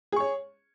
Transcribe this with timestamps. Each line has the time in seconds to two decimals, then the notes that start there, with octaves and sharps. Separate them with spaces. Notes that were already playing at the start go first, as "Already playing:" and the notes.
0.12 G#4
0.16 C#6
0.20 C#5